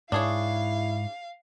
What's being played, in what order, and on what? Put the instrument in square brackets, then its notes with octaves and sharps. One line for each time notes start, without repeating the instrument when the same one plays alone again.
[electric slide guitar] G#2 [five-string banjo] D4 G#4 C#5 [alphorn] E4 [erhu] F5